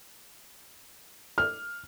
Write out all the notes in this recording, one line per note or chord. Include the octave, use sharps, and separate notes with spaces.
F6